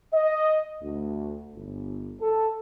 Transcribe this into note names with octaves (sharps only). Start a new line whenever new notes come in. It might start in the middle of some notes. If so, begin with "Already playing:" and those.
D#5
D2
G1
A4